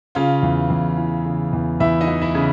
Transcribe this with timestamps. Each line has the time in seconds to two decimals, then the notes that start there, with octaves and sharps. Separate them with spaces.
0.15 C#3 F4 F5
0.43 E2
0.70 E2
0.97 E3
1.25 C#3
1.53 E2
1.80 E2 E4 E5
2.00 D#4 D#5
2.08 E3
2.22 E4 E5
2.35 C#3